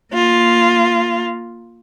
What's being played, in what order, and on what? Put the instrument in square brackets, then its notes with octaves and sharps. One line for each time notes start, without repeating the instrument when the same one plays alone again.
[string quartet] A#3 F4